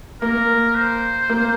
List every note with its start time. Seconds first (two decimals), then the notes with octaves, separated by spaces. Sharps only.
0.21 A#3 A#4
0.75 C5
1.29 A#3